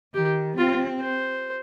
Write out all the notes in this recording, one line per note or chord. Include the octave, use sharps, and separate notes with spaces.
D#3 G4
C4 F4
C5